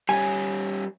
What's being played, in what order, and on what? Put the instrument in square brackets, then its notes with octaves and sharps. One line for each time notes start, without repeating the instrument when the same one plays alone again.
[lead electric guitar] G3 C#4 [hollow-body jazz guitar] G#5